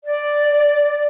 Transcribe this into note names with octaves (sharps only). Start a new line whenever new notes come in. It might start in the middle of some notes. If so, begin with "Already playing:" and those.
D5